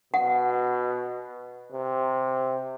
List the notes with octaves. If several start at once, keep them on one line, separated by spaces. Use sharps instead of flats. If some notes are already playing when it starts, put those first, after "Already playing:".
B2 F#5
C3